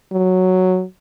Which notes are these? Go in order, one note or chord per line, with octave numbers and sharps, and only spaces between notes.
F#3